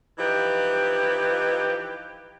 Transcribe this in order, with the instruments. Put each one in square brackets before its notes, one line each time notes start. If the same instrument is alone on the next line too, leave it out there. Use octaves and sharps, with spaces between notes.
[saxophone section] E3 F3 D#4 G4 B4